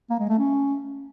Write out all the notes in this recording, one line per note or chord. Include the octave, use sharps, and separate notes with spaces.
A#3
G#3
A3
C#4